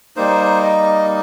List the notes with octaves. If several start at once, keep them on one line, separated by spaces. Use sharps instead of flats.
G3 A#3 D#4 C5
D#5